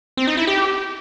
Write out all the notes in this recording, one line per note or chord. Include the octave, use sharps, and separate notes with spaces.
C4
D#4
E4
G4